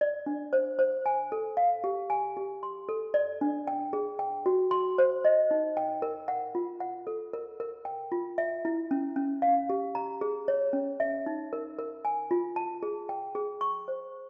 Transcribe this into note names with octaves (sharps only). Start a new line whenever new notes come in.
D5
D4
C5
C5
G#5
A4
F5
G4
G#5
G4
C6
A4
D5
D4
G5
G#4
G5
F#4
C6
C5
D#5
D#4
G5
A#4
F#5
F4
F#5
A4
A#4
A#4
G5
F4
E5
E4
C#4
C#4
F5
G4
A#5
G#4
C#5
C#4
E5
D#4
A#4
A#4
G#5
F4
A5
G#4
G5
G#4
C#6
C5